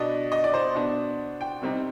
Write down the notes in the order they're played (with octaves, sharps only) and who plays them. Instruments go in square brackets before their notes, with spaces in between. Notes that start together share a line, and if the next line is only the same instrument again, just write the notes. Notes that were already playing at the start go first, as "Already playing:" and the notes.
Already playing: [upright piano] B2 B3 D4 D#5
D#5
D5
C5
B2 B3 D4
G5
C3 G3 C4 D#4